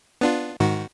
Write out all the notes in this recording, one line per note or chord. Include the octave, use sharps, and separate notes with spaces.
B3 D4 F4
G#2 D#3 F#4